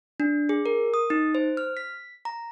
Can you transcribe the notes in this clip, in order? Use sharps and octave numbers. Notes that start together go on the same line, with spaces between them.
D4
G#4
A#4
D#6
D#4
C5
F6
B6
A#5